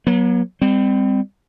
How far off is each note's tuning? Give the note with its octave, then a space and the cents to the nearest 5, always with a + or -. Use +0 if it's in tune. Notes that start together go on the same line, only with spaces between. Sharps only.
F#3 +0 B3 -45
G3 +35 C4 -15